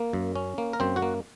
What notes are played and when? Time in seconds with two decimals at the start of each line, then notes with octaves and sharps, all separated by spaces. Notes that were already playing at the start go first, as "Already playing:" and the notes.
Already playing: A#3
0.13 F#2
0.36 C#4
0.58 A#3
0.73 A#4
0.80 F#2 C4 C5
0.96 F#4 F#5
1.02 A#3